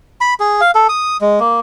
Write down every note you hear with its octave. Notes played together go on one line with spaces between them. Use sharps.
B5
G#4
F5
A4
D#6
G#3
A#3